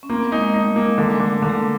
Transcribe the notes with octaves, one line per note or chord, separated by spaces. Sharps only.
C#4
A#3 C4
B3
G#3 D#4
G#3
A3 D#4
G3
G#3 A#3
G#3
D3 G3
G#3
D3
A3
D3 A#3
A3